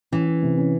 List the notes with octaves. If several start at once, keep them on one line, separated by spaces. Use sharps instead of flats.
E3 C#4
C#4
C3
C#4